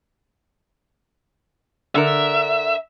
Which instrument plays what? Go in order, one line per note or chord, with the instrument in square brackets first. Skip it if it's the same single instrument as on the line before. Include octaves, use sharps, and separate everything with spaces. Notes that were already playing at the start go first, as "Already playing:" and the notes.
[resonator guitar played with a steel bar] D3 A#4 [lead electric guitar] E5